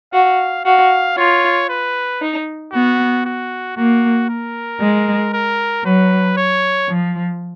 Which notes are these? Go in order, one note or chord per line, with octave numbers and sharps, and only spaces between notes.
F#4 F5
F#4 F5
F4 C#5
B4
D#4
B3 F#4
F#4
A#3 F#4
A#4
G#3
A#4
F#3 B4
C#5
F3